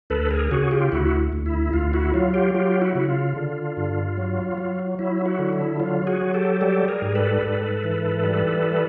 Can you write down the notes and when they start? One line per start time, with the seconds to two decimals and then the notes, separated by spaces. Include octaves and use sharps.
0.10 D2 A4 B4
0.31 G#4 A#4
0.51 C#3 F#4 G#4
0.71 F4 G4
0.92 D2 E4 F#4
1.33 D2
1.46 E4
1.73 D2 F4
1.93 E4 F#4
2.14 F#3 F4
2.34 F4 G4
2.54 F#3 F4 G4
2.81 E4 F#4
2.95 C#3
3.09 F4
3.36 D3
3.77 G2
4.17 F#3
4.58 F#3
4.99 F#3 E4
5.26 E4 F#4
5.39 D3
5.53 E4
5.80 F#3 F4
6.07 F#4 G#4
6.21 F#3
6.34 G4 A4
6.61 G3 G4 A4
6.88 G#4 A#4
7.02 G#2
7.15 A4 B4
7.42 G#2
7.84 E3
8.24 G3